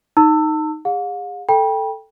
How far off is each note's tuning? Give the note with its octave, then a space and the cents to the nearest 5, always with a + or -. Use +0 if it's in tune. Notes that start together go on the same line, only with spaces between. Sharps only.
D#4 +0 A5 +35 E6 +0
G#4 -35 F5 +45
A4 +0 G5 +10 B5 -35